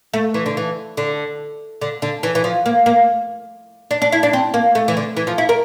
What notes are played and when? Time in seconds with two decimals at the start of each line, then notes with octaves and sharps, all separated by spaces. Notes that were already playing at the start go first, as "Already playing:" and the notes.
0.14 A3
0.34 E3
0.46 D3
0.57 E3
0.97 D3
1.81 D3
2.02 D3
2.23 E3
2.35 E3
2.44 F3
2.66 A#3
2.86 A#3
3.91 D4
4.02 D4
4.12 E4
4.23 D4
4.33 C4
4.54 A#3
4.75 A3
4.88 E3
4.97 D3
5.17 E3
5.27 F3
5.38 E4
5.49 A#4